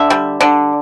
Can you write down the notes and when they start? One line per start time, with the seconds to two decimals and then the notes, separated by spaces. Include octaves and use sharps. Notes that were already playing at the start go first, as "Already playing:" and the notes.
Already playing: D3 E5
0.10 G3
0.41 D3